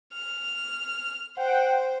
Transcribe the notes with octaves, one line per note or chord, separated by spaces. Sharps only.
F6
C5 F#5 G5